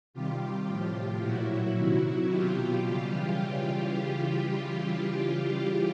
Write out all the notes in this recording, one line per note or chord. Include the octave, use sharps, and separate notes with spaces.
C3 D#3 G3 F4 G4
A2 F3
A#2 F#3 E4 F#4
C3 D#3 F#3
B2 F#3 F4 G4
C#3 E3 G3